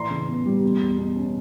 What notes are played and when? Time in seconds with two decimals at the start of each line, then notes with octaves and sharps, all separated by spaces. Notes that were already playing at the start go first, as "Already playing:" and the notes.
Already playing: A2 E3 A#5 C6
0.11 C#3
0.28 B3
0.46 G3
0.63 B2
0.81 E2
0.98 B2
1.16 C#4